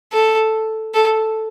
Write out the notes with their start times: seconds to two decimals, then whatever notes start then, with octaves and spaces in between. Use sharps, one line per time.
0.13 A4
0.94 A4